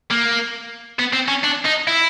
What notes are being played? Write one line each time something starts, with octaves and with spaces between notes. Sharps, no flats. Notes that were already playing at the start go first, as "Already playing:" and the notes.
A#3
B3
C4
C#4
D4
D#4
E4